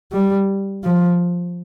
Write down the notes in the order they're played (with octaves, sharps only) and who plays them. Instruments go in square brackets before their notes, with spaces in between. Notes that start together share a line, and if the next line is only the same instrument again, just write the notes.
[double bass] G3
F3